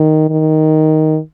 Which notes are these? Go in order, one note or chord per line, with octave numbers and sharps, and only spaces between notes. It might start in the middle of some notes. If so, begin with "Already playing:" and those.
Already playing: D#3
D#3